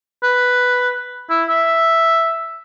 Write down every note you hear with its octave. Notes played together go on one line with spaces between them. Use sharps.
B4
E4
E5